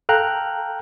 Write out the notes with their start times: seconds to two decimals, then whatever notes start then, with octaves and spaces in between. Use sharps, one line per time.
0.09 A4 F5 G5 A#5 F#6